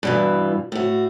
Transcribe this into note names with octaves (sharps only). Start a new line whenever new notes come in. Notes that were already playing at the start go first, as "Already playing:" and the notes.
G2 B2 E3
A2 F#4